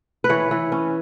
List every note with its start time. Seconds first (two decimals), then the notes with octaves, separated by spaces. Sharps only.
0.24 B4
0.29 E3 C#5
0.51 E3
0.72 C#4